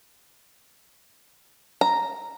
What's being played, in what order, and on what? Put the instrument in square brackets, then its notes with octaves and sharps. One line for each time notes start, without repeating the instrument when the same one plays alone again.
[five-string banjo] A#5